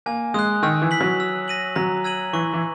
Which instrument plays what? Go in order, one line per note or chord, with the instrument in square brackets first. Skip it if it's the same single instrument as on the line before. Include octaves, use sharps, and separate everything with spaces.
[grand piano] A#3 [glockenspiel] G#5
[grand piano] G#3 [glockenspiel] D#6 F#6
[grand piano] D#3 [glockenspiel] E6
[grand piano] E3
[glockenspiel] B6 F#7
[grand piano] F#3
[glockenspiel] E6
A#6 D#7 F#7
[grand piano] F#3 [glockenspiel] A#5
[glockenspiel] E6 G#6 D#7 F#7
[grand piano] E3 [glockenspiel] C#6
[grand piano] E3